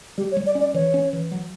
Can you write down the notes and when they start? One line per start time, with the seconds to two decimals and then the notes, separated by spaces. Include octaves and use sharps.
0.18 G3 G4
0.32 C#5
0.37 G3
0.47 D5
0.55 C#4
0.61 D5
0.74 E3 C#5
0.94 C#4
1.13 E3
1.31 F#3